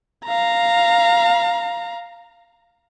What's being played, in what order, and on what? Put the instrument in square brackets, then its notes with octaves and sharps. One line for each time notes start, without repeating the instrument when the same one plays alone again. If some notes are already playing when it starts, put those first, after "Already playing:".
[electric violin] F5 A#5